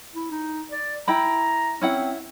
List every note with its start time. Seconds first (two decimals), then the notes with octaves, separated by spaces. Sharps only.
0.15 E4
0.31 D#4
0.72 D5
1.08 E4 G5 A#5 B5
1.81 C4 C#4 E4 F#5